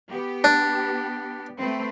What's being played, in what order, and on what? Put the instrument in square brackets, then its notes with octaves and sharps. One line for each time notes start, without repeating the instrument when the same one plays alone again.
[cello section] B3 G4
[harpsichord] D4
[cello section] A3 C4 B4